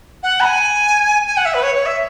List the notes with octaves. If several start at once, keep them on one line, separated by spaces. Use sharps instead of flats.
F#5
B5
G#5
G#5
F#5
E5
B4
C#5
C#5
E5